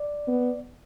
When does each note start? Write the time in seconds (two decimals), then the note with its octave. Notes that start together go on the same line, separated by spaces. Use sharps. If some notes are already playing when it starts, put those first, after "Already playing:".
Already playing: D5
0.28 B3